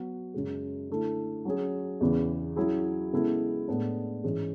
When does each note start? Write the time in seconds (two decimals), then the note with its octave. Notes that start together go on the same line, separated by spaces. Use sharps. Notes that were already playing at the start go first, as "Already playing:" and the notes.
Already playing: F#3 B3 F#4
0.34 F#2 C#3 G#3
0.89 D3 A3 E4
1.45 F#3 C#4 G#4
2.01 E2 C#3 E3
2.56 F#3 C#4 E4 G#4
3.13 C#3 G#3 B3 E4 A4
3.68 A2 G#3 B3 D4
4.24 G#2 E3 G#3 C#4